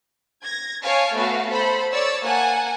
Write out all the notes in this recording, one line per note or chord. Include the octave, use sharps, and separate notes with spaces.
G#6 A#6
C#5 F5 G#5 A5 D7
A3 B3 F#4 F5
A4 C5 B5
C#5 D5 E6 A6
A#3 F#5 G#5 A5